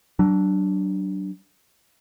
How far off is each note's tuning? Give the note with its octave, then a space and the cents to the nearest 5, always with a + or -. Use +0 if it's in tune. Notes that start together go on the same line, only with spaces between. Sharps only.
F#3 +30 D4 +0